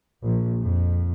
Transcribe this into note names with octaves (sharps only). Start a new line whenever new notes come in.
A#1
F2